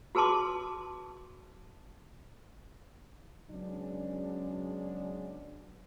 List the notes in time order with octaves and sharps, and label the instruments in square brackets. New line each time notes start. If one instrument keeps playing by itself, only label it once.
[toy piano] F#4 G#4 B4 A5 C6 D6
[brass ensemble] C#3 F#3 G#3 B3 C#4 D4